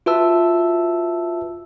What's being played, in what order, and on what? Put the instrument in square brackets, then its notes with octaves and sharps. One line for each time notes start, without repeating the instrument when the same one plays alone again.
[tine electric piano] F4 F#4 B4 E5 A5 E6